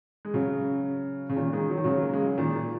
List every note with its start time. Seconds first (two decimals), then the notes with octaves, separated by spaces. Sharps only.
0.25 G#3
0.34 C#3 F#3
1.30 C#3
1.36 A#2 D#3
1.53 D#3 G#3
1.70 F#3
1.77 D#3
1.84 C#3 F#3
2.02 A#3
2.13 G#3
2.25 F#3
2.38 A#2 D#3
2.55 A#2